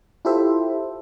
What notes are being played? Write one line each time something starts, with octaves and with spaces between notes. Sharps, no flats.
E4 F4 G4 A4 C5 E5